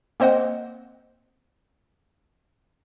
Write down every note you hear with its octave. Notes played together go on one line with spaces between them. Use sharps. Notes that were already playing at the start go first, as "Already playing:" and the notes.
A#3 C4 C5 D#5 F#5